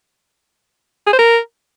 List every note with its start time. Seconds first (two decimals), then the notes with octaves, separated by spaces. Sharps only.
1.07 G#4
1.13 C5
1.19 A#4